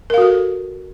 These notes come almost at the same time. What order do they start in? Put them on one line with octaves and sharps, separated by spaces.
A#4 F5 F#4 A4